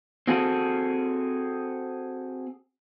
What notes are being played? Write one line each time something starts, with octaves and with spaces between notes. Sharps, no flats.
C4 F#4 G#4 A4